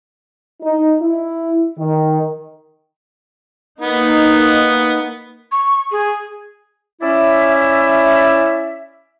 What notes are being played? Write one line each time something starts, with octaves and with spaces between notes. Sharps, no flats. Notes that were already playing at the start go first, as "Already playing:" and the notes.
D#4
E4
D#3
A#3 B3 D#4
C#6
G#4
C#4 E4 D5 E5